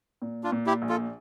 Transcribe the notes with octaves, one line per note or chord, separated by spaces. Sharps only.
A#2
D4 F4
A#2
E4 G4
A#1
F4 A4